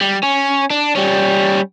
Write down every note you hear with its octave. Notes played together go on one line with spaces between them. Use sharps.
G3
C#4
D4
G3 C#4